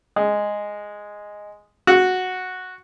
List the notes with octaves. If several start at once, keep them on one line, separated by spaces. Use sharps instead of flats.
G#3
F#4